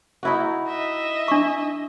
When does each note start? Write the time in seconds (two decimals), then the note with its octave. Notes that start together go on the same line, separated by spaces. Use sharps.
0.23 D#4 E4 F#4
0.67 D#5 E5
1.28 D4 C#6